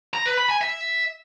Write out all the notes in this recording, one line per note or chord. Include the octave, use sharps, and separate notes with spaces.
A#5
B4
B5
G#5
E5